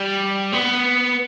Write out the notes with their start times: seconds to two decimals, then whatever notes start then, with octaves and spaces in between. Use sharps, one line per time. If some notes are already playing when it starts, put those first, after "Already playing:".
Already playing: G3
0.52 B3